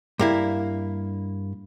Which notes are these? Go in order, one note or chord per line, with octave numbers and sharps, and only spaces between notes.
G2 A#3 E4